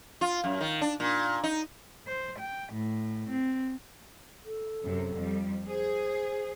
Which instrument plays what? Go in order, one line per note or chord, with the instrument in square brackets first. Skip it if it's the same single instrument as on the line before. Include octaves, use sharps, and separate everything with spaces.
[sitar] F4
F#2
D#3
D4
A#2
D#4
[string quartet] C5
G5
A2
C4
[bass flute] A4
[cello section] F#2 C3
F2 G3
[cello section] G#4 [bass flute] C5